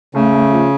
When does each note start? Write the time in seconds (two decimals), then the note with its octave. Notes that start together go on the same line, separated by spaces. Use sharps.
0.15 C#3 A3
0.33 A3
0.51 F3